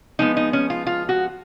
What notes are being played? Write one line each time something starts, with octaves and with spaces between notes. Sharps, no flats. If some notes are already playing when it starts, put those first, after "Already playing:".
F3 G#3 B3 D#4
D#4
C#4
F4
F4
F#4